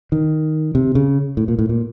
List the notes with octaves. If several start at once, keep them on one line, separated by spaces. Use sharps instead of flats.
D#3
C3
C#3
A2
A#2
A2
A#2